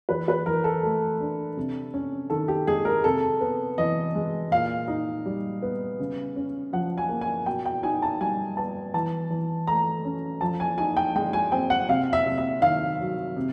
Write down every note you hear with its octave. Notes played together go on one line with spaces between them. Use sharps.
E3 B4
B4
E3 A#4
A4
A3
D4
C3
C#4
D#3 A4
G4
G#3 G#4
A#4
C3 A4
B3
E3 D#5
G#3
A#2 F5
D#4
G3
B3
C#3
C#4
F3 F#5
G#5
A#3
G#5
B2 G5
G5
D#4 G#5
A5
G3 G#5
B3 A5
E3 A5
E3
A3 A#5
C#4
F3 A5
G#5
D#4 G#5
G5
G#3 G5
G#5
C4 G5
F#5
C3 F5
E5
C3
E5
D#3 F5
F#3
C3